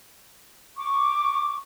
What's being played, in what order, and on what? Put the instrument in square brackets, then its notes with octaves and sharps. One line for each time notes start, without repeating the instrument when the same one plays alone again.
[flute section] C#6 D6